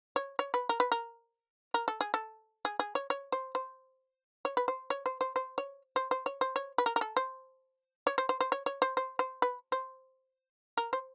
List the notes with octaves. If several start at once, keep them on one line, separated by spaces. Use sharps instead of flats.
C#5
C#5
B4
A#4
B4
A#4
A#4
A4
G#4
A4
G#4
G#4
C#5
C#5
C5
C5
C#5
B4
C5
C#5
C5
C5
C5
C#5
C5
C5
C#5
C5
C#5
B4
A#4
A#4
A4
C5
C#5
C5
C5
C5
C#5
C#5
C5
C5
C5
B4
C5
A#4
C5